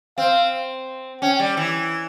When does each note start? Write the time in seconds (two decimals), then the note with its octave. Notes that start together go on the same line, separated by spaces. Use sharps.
0.17 C4 F5
1.22 C#4 G5
1.40 G3
1.57 E3